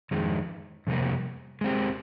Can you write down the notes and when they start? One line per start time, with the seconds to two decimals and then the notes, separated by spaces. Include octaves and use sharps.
0.11 F2 D#3 G#3
0.87 F2 C3 G3 A#3
1.61 G#3 C4 G4